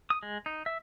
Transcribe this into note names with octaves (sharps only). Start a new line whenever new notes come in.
D#6
G#3
D#4
E5